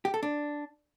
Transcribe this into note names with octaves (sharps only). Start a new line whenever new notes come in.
G4
A4
D4